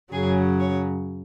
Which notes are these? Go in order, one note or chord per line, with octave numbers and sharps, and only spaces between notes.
F#2 C#3 F#3 G#4
C#5